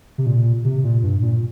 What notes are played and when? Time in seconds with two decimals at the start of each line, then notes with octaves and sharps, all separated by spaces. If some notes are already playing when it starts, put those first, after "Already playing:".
0.18 C3
0.26 A#2
0.65 C3
0.84 A#2
1.03 G2
1.22 A#2